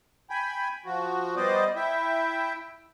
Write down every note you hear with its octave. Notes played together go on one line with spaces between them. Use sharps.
G5 G#5 B5
F3 F#4
G3 B3 C5 D5 D#5
E4 E5 G5